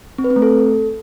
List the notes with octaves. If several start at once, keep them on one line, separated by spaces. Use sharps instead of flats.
C4
B4
C4
A3
A4